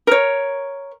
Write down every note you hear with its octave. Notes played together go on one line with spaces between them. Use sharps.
A#4 C#5